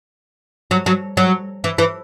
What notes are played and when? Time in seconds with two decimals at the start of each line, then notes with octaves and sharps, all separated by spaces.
0.71 F#3
0.86 F#3
1.17 F#3
1.64 E3
1.78 E3